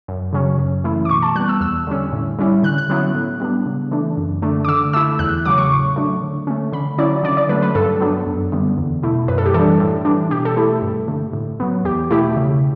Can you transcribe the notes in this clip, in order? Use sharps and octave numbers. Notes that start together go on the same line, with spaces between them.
F#2
C#3 F#3 C#4
F#2
E3 A3 E4
D6
B2 C#6
A5
G3 B3 F#6
E6
E2 E6
D3 G3 C#4
A2
G3 C#4 E4
D3 F#6
F#6
F#3 B3 E4
A2
G3 B3 D4
C#3
E3 A3 D4
F#2
D3 A3 D4
D6
D3 E6
A3 E4 E6
E2 F#6
C#3 F#3 D6
C#6
A2
F#3 A3 D4
D3
A3 C#4
D3 B5
F#3 C#4 E4 D5
D3 D5
D5
F#3 A3 B4
B4
G2 A4
F#3 B3 D4
F#2
D3 G3 B3
E2
B2 A3 E4
F#2 B4
A4
G4
E3 G3 D4 A4
A2
E3 G3 D4
B2 G4
A4
A3 E4 G4
G2
D3 A3
A2
F#3 B3
E2 G4
B2 A3 E4 G4
C#3